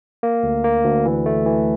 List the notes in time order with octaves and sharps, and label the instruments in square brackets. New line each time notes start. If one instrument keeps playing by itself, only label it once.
[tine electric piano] A#3
D2
A#3
D2
E3
A3
E3